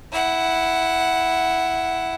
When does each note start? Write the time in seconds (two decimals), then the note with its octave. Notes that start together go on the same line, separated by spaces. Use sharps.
0.12 E4 F#5